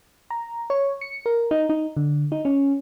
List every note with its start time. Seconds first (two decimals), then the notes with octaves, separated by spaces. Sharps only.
0.30 A#5
0.70 C#5
1.01 C#7
1.26 A#4
1.51 D#4
1.69 D#4
1.97 D3
2.32 D#4
2.45 C#4